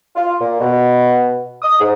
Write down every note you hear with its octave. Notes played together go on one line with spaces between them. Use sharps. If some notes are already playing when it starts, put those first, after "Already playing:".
F4
A#2
B2
D#6
G#2